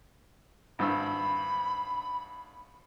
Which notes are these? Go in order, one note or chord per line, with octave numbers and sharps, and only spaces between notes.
G#1 G2 B5 E6